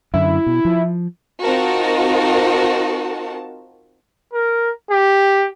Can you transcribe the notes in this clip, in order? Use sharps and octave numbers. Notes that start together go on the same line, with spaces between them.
F#2 D3 E4
B2
F3
C4 D#4 F4 F#4 A#4 A5
A#4
G4